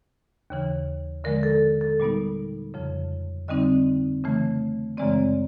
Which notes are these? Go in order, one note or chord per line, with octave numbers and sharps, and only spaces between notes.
D#2 C#3 E3
D3 F3 G#3 A#4
A4
A4
A#2 G3 B3 D#4
F2 C#3 F3
D3 G3 C4 D#4 D#5
C#3 E3 A3
F#2 C#3 E3 G#3 C4 D5